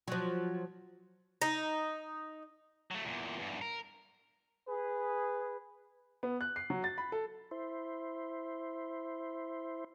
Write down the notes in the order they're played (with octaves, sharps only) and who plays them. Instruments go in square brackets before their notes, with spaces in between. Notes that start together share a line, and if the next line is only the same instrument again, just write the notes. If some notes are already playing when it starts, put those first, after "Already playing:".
[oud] F3 F#3
[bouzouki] D#4
[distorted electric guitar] F#3 A3
E2 A#2
E2 G2
A#4
[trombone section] G#4 B4
[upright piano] B3
F#6
C7
F#3
A6
B5
A4
[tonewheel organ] E4 C5